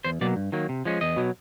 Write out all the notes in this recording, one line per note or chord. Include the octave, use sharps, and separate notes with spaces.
E2 C5
B2 F#3 A#3 D5
G2
D#3 F#3 A#3
C3
F3 G#3 C#4
E2 D#5
B2 F#3